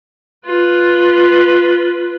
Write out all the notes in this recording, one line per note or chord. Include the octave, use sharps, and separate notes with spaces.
F4 B4